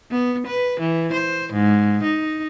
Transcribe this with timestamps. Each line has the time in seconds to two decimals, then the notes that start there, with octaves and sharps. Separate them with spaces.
0.11 B3
0.47 B4
0.80 E3
1.13 C5
1.53 G#2
2.03 D#4